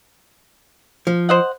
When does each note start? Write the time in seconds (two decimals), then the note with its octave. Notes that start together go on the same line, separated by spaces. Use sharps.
1.07 F3
1.29 C5 D#5 F#5